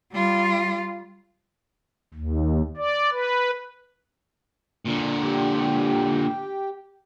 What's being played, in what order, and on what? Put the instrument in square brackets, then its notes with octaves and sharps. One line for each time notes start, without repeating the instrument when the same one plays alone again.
[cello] G3 F4
[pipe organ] D#2
D5
B4
[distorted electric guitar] A#2 D3
[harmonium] G4